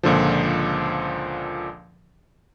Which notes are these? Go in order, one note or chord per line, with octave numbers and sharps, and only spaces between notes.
C#2 A#2 D3 F3